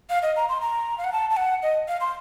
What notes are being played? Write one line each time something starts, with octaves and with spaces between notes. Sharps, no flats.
F5
D#5
A#5
C6
A#5
F5
F#5
A5
A5
F#5
D#5
F5
C6